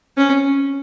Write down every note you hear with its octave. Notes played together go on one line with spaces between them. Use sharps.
C#4